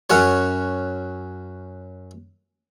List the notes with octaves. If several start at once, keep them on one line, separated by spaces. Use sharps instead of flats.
F#2 C#4 F#4 C#5